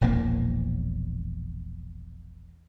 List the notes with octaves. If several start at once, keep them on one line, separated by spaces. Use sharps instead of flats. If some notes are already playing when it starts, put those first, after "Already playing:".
E1 A#1 E3 A#3